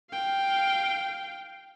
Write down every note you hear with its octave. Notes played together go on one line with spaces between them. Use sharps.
F5 G5